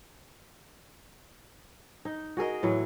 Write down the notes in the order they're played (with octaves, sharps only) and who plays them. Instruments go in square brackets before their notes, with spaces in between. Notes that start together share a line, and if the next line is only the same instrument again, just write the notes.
[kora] D#4
F#4 G#4 A#4 D#5
A2 E3 F#3 B4